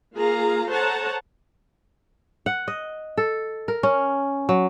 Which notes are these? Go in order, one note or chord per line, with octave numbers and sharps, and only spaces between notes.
A#3 F4 G#4 F5 A#5
A4 C5 C#5 F#5 A5 A#5
F#5
D#5
A4
A#4
C#4
F#3